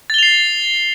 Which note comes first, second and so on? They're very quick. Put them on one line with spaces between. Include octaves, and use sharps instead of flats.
A6 G7 F7 C7